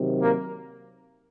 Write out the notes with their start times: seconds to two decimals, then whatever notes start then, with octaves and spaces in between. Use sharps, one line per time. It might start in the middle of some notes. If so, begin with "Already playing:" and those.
Already playing: C3 D#3 F#3
0.23 A#3 A#4